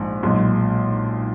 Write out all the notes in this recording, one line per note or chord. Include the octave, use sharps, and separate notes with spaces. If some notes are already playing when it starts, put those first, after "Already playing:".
Already playing: A#1 G#2
B1 A#2 G#3